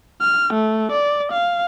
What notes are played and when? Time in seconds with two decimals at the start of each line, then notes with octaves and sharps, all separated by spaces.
0.21 F6
0.54 A3
0.92 D5
1.32 F5